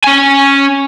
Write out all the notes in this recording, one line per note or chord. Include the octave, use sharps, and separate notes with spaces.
C#4 G#5